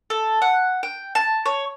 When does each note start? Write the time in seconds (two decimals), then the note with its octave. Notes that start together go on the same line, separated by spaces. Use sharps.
0.10 A4
0.42 F#5
0.83 G5
1.15 A5
1.46 C#5